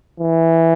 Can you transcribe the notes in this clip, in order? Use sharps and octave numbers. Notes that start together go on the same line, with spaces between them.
E3